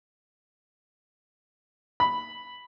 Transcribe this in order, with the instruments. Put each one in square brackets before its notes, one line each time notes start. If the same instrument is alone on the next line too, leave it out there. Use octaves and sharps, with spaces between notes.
[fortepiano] B5